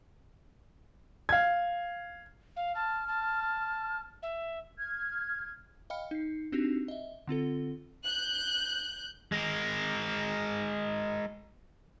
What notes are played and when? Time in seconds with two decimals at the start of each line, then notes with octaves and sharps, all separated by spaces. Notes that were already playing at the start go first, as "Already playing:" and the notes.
1.29 F5 G#6
2.56 F5
2.75 A5 F6
3.08 A5
4.22 E5
4.77 F6 G#6
5.90 D#5 F5 G5 B5 F6 C#7
6.11 D#4 C7
6.52 C4 D4 D#4 F#4 G4
6.88 D#5 E5
7.27 D3 C4 F4 A4
8.04 F#6 G6
9.32 G#3 A#4